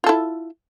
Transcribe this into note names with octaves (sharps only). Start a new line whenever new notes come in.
E4 F4 A4